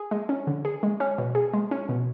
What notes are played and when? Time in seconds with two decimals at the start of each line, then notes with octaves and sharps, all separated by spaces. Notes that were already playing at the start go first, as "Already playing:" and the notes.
Already playing: G#4
0.11 G#3
0.29 C#4
0.47 D3
0.65 G#4
0.83 G#3
1.00 C#4
1.18 B2
1.35 G#4
1.53 G#3
1.71 C#4
1.89 B2